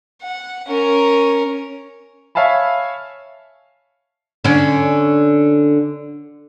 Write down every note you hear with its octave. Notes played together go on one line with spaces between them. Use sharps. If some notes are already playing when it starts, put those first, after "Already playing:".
F#5
C#4 A#4
C#5 E5 F5 G#5 A5 B5
D3 C#4